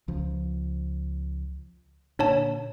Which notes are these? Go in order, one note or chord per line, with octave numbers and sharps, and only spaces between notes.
C#2 F3
A#2 D3 D4 C#5 A5